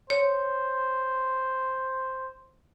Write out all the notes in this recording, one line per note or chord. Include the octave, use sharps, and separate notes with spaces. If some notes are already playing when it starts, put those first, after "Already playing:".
C5 C#5